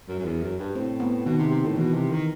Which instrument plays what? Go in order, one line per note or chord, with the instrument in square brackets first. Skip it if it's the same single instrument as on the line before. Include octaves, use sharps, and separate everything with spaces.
[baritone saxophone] F#2
F#2
E2
F#2
G2
[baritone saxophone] A2 [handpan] C4
[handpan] B3
[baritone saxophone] B2 [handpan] D#3
[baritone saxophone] C3
C3
A2
[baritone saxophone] B2 [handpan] E3
[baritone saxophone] C3
D#3